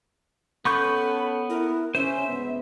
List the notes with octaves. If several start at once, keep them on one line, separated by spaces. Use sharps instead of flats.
B3 C#4 A4 B5 C#6 G6
E4 A#4
C#3 C#4 C5 E5
D2 G#2 B3